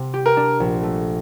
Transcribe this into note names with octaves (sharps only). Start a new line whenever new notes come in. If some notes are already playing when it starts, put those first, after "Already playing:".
Already playing: C3
G4
A#4
D4
A#1
A3